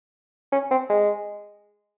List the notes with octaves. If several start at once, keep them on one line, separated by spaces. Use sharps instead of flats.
C#4
C4
G#3